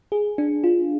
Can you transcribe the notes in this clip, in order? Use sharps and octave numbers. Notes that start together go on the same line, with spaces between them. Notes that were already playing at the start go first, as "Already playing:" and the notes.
G#4
D4
F4